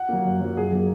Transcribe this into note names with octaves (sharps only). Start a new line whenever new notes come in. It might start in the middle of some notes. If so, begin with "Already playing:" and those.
Already playing: F#5
F#3 A#3
F#2
F#3 A#3
F#2 G#4
F#3 A#3